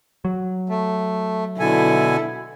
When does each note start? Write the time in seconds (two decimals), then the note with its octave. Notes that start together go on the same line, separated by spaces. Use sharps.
0.25 F#3
0.69 A3
1.59 B2 D3 E4 A4 G#5